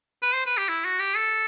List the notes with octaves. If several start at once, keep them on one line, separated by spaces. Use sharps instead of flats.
B4
C5
B4
G4
E4
F#4
G4
A4